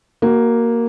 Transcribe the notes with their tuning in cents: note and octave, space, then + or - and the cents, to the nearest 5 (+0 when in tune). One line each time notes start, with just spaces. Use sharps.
A#3 +0 F#4 +20